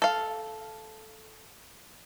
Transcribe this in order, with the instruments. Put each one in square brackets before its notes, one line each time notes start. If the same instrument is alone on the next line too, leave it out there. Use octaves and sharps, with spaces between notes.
[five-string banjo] A4 F5